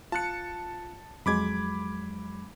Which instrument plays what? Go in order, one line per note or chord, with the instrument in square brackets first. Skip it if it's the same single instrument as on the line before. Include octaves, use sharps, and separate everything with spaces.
[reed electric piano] F4 F#6 [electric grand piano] A5 C#7
[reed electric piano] F2 F#3 G#3 [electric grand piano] B5 D6 G#6